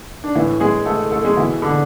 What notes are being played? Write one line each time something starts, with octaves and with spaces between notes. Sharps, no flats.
D4
A2 E3 E4
G#3 G#4
A3 A4
A3 A4
G#3 G#4
B2 E3 E4
D3 D4